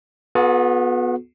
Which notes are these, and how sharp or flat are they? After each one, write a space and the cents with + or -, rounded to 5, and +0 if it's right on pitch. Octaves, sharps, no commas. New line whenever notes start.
B3 +0 F#4 -45 A4 -40